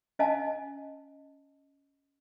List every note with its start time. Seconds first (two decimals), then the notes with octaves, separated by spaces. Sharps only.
0.19 C#4 D#5 F5 G#5 A5